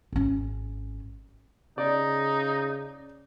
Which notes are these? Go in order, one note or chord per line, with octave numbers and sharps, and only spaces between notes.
G#1 C#4
C#3 D#4 D5